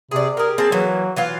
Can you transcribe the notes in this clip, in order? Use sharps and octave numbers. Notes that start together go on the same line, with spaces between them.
C3 G#4 D5
G4 G#4 A#4
C4 G#4 A5
E3 F#3 A#3
E3 F#3 F4